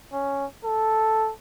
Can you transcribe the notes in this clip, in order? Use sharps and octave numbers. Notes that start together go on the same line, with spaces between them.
C#4
A4